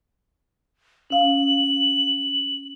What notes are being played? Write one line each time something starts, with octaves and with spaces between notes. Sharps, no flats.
C#4 F5 F#7